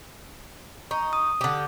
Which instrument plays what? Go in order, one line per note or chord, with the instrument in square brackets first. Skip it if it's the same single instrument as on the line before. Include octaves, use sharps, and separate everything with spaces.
[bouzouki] D#4 [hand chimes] C#6
[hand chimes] D#6
[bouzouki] D3 G4